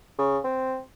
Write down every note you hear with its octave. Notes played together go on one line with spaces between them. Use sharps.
C#3
C4